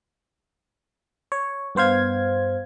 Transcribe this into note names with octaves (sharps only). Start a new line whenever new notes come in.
C#5
G2 B3 C5 F5 G#6